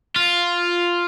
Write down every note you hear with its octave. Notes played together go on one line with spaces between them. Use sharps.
F4